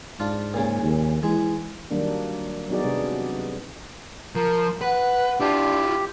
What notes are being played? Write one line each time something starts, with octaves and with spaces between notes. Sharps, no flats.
G#2 D4 F4
A#2 C#3
D#2
E3 G#3
D#3 F#3 G3 A#3 D4
F#3 B3 D#4 F#4 G#4 D5
C3 G#3 D4
F3 A#4
B4 F#5
D4 E4 F4 G4